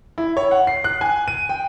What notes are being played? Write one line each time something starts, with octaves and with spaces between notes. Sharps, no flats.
E4
C#5
F#5
C7
F#6
G#5
D#7
G5